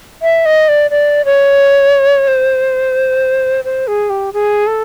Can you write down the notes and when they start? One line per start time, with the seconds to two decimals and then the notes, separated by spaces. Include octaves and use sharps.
0.22 E5
0.46 D#5
0.69 D5
0.91 D5
1.25 C#5
2.27 C5
3.65 C5
3.87 G#4
4.10 G4
4.33 G#4
4.67 A4